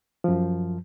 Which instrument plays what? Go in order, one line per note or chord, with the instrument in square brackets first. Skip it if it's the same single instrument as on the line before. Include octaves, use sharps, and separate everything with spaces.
[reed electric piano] F#2 F3